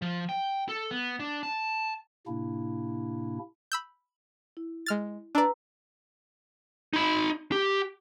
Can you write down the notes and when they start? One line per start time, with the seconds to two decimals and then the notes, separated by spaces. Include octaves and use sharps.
0.02 F3
0.29 G5
0.69 A4
0.91 B3
1.20 D4
1.43 A5
2.27 A2 C3 A#3 D4 E4
3.72 B5 E6 G6
4.57 E4
4.86 G#3 F6 A6
5.35 D4 B4 D5 A#5 E6
6.93 D#4 B5
7.52 G4